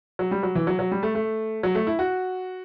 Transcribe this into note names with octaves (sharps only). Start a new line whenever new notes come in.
F#3
G3
F#3
E3
F#3
F#3
G3
A3
A3
F#3
A3
E4
F#4